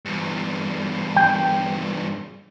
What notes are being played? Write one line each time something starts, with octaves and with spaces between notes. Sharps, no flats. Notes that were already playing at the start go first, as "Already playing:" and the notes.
E2 G2
G5